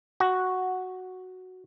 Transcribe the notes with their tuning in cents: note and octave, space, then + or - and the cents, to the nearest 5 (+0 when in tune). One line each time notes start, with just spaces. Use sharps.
F#4 +0